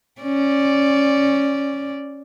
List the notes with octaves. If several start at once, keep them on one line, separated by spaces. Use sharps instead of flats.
C#4 D5